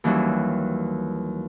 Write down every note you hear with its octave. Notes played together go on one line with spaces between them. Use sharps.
D#2 E3 F#3 G3 C#4 F#6